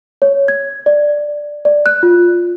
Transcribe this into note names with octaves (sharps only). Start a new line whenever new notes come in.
C#5
G#6
D5
D5
F#6
F4